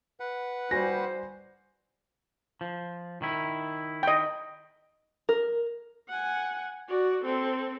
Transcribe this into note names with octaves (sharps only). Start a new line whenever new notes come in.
B4 F#5
G3 F#4 C5 G#5 A#6
F3
D#3 E4
D#5 G5
A#4
F#5 G#5
F#4 D5
C4 A4